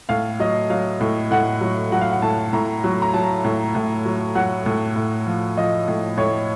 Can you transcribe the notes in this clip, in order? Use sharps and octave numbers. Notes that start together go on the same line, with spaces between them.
A2 F5
F#3 D#5
F#3 F5
A2
A2 F#5
F#3
F#3 F#5
F5
F#5
A2 A5
A2 A#5
F#3
A#5
F#3 A5
A2
A2
F#3
F#3 F#5
A2
A2
F3
F3 D#5
A2
A2 C#5